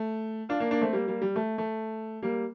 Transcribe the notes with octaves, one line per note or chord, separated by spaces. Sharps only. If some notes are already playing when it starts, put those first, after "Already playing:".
Already playing: A3
D4 F4
A#3 D4
A#3 D4
A3 C4
G3 A#3
G3 A#3
G3
A3
A3
G3 A#3